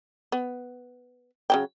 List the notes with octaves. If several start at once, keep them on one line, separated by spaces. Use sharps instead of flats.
B3
C#3 F#3 G5